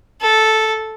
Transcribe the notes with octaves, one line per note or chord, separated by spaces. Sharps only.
A4